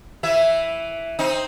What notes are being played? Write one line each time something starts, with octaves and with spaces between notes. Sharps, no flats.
E3 E4 E5
C4 D#4